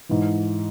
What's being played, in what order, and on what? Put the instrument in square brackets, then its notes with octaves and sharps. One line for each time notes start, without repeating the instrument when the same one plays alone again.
[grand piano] G#2 E3